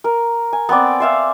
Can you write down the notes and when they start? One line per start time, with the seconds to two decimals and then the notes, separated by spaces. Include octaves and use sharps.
0.04 A#4
0.53 G#5
0.69 B3 C4 D5
1.00 C5 E5 F5